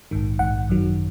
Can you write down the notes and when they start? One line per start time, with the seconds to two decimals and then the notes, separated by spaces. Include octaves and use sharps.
0.11 A#1 G#2 D#3
0.39 A#1 G#2 D#3 F#5
0.68 G#1 F#2 D#3 F#3